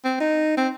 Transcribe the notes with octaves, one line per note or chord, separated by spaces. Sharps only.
C4
D#4
C4